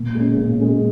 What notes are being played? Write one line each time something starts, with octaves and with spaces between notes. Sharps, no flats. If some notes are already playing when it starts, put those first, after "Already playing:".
Already playing: A#2
G#3 C#4
A#2
G#3 C#4